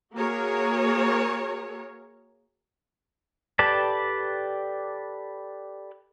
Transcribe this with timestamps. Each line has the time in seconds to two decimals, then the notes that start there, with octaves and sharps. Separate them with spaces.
0.15 A#3 F#4 G#4 A#4 C#5
3.59 G4 A4 B4 D5 A5